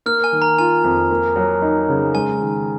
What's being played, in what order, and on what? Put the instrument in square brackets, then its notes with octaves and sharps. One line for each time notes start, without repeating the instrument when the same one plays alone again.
[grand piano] A#3 [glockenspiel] F6
[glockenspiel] G#5
[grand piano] D#3
[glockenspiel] A#5
[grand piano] F4 [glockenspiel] G#5
[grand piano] F2
A#3
F#3
D#4
C#3
[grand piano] G#3 [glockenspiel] G#5
[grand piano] D#3